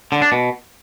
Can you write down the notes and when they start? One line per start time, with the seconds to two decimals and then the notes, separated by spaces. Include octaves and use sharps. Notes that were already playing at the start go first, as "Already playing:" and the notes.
0.12 D3
0.22 D4
0.32 B2